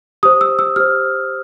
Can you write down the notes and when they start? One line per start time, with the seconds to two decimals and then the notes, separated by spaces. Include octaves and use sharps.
0.23 G4 C5 D#6
0.41 E6
0.59 E6
0.76 G4 C5 F6